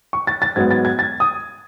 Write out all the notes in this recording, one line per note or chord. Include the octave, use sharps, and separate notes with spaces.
C#6
A6
A6
G#2 F#3 B3 G#6
A6
G#6
A6
D#6